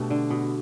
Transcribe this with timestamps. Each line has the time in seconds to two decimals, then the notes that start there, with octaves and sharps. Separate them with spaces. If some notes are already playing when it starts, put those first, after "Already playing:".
Already playing: B2 A3 D4 G4
0.10 D3
0.30 B2